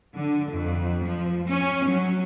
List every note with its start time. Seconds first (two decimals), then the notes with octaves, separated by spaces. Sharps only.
0.17 D3
0.52 F2
1.04 F3
1.48 C#4
1.88 F#3